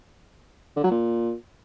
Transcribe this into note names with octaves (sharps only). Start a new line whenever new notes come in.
D3
F#3
A#2